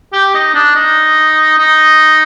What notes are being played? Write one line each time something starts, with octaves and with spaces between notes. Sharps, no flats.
G4
D#4
D4
D#4
D#4